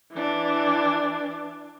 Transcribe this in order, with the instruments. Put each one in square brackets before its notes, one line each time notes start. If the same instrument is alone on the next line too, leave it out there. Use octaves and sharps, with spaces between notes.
[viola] E3 D4